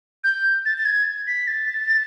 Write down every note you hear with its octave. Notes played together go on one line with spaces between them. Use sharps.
G6
A6
A6
G#6
B6
A6